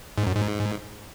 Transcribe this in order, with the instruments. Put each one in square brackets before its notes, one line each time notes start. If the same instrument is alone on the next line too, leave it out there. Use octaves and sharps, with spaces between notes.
[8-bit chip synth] G#2
F#2
G#2